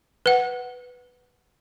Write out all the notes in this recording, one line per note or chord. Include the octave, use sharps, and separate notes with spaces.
B4 F#5